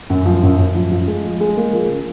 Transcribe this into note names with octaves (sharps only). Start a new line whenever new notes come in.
F#2
F3
F#2
F#2
F3
F3
G#3
F3
G#3
A#3
F3
C#3